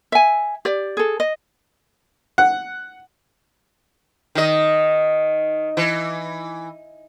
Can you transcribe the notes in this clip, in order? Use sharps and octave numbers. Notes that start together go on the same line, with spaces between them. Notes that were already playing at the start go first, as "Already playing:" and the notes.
E5 G#5
G4 D5
G#4 A4
D#5
F#5
D#3 D#5
E3